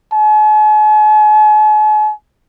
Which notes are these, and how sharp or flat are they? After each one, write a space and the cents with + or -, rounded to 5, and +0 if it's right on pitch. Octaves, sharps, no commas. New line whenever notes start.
G#5 +45